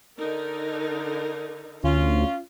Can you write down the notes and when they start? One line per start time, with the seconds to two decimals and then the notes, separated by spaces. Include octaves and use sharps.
0.17 D3 D#4 A#4
1.84 D2 C#4 F4